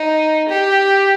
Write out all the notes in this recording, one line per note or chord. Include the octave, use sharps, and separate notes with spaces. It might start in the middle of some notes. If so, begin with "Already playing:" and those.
Already playing: D#4
G4